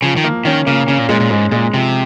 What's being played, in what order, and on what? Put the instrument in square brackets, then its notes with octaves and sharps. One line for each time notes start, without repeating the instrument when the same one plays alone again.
[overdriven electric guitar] C#3 [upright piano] F3
[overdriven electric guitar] D#3
[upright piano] A#3
[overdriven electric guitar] D#3 [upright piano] C#4
[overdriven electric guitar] C#3 [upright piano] A#3
[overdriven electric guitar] C#3 [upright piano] C#4
[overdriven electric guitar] A#2
[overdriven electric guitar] A#2 [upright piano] G#3
[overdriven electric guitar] A#2
[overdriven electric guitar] G#2 [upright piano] G#3
[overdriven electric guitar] A#2 [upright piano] G#3
[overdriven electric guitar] C3 [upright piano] F3